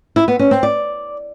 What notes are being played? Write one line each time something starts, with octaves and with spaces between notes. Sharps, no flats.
E4
B3
C#4
C4
D5